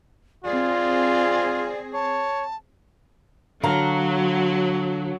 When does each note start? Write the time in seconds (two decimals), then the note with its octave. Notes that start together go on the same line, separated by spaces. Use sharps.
0.45 C4 F4 G#4 D5
1.94 C#5 A5
3.63 D3 F#3 F5 A#5